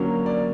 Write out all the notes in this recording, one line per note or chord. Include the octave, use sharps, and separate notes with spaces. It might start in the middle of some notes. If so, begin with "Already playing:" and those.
Already playing: D3 F#3 A#3 C#4
D5